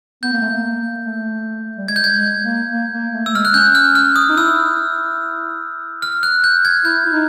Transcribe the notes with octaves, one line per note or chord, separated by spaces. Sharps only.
B3 G6
A#3
A3
A#3
A3
G3
G#3 G#6
G6
G#6
G#3
A#3
A#3
A#3
A3
E6
G#3 F6
F#6
C#4 G6
F6
F6
D#6
D#4
E4 E6
F6
F#6
G6
G#6
E4 G6
E4
D#4